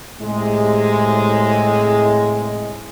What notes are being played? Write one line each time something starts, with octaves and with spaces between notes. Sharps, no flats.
A2 C3 G#3